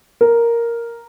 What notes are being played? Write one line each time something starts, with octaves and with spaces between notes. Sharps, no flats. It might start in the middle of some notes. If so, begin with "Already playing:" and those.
A#4